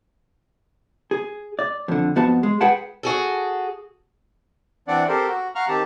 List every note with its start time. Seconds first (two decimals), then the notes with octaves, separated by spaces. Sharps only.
1.11 G#4
1.59 D5
1.88 F2 D3
2.16 F2 B3 F#4 F5 A5
2.43 G#3
2.61 G#4 B4 F#5 G5 A5
3.03 F#4 G#4 A4
4.88 E3 C4 D4 D5 F#5
5.08 C4 G4 A4 A#4 C5
5.27 F#4
5.55 F5 F#5 A#5 C#6 F6
5.68 D#3 C4 G4 A5